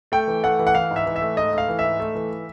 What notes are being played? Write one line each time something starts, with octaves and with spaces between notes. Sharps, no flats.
A3 G5
E3
A3 F#5
E3
F#5
E3 F5
G#2
E5
E3
E5
A3
G#2 D#5
A3
F5
E3
G#2 E5
A3
E3